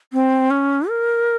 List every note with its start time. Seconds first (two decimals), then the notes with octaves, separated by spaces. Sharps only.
0.13 C4
0.51 C#4
0.89 A#4